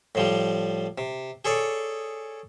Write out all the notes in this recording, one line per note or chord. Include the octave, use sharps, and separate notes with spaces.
A2 F3 G3
C3
G#4 A4 C#5 D5